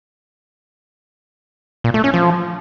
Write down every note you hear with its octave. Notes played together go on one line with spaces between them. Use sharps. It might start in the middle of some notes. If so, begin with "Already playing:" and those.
A#2
A3
C#4
F3